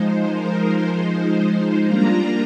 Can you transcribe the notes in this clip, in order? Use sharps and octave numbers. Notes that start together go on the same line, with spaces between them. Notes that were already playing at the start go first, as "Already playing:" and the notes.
Already playing: F3 G#3 D#4 C5
A#4
F3 G#3 D#4 C5
G3 A#3 D4 F4 A#5